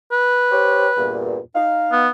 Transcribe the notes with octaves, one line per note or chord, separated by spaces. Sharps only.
B4
G4 C5 C#5
E2 G2 A#2
D#4 F5
B3